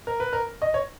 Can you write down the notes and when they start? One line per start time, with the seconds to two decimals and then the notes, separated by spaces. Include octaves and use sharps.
0.07 A#4
0.20 B4
0.33 A#4
0.62 D#5
0.74 C#5